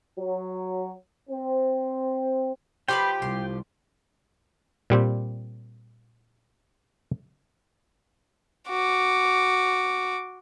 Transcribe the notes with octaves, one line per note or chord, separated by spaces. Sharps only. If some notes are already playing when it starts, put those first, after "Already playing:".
F#3
C4
F3 G4 B4 G5 B5 C6
C2 C6
A#2 G3 C4 G4
F#4 D6